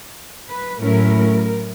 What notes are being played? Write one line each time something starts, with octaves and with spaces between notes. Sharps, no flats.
B4
A2 F#3 A3 C#4 E4 A#4